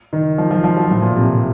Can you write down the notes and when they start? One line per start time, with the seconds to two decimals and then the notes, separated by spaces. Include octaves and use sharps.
0.13 D#3
0.38 F3
0.51 F3
0.64 F3
0.76 F#3
0.90 A2
1.02 A#2
1.16 C3